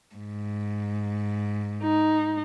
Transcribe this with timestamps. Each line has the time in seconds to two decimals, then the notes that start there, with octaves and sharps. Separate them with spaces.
0.17 G#2
1.82 D#4